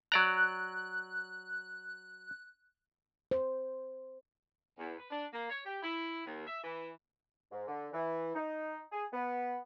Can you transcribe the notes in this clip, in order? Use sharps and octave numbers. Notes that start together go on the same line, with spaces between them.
F#3 D5 A#5 F#6
C5
E2
B4
D4
A#3
C#5
G4
E4
D#2
E5
E3
G#2
D3
E3
D#4
G#4
B3